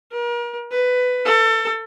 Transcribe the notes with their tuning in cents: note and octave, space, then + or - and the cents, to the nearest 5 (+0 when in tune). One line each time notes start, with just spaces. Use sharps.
A#4 +40
B4 +15
A4 +30